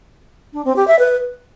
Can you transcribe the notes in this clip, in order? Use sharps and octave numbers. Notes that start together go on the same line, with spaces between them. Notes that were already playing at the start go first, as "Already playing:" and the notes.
D4
C4
G4
E5
B4